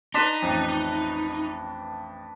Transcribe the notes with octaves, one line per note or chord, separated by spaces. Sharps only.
D4 D#4 B4 C6 B6 E7
A1 F2